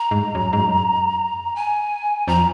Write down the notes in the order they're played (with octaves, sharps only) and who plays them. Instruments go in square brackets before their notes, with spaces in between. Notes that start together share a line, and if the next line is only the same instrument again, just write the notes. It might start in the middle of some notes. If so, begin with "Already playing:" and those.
Already playing: [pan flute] A#5
[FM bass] G#2
F#2
G#2
F#2
[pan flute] G#5
[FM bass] F2 [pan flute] A#5